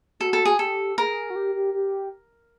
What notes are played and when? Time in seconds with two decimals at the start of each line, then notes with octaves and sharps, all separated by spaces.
0.20 F#4 A4
0.33 A4
0.45 G#4
0.58 G4 A4
0.98 G#4 A#4
1.30 F#4
1.36 G4
1.55 G4
1.74 G4